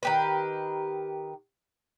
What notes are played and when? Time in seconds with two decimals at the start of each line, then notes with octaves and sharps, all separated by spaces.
0.03 D#3 G4 B4